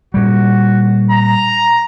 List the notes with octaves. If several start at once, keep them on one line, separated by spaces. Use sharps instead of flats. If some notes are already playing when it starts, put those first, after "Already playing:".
A#2 G3 F#4
A#5